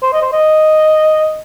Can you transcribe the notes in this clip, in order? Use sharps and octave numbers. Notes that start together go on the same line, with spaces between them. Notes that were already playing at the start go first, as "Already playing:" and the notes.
C5
D#5
C5
D#5